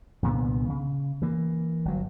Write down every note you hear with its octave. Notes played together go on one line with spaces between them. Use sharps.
C2 A#2 D3 B3
C#3
E3 A#3
G1 F#3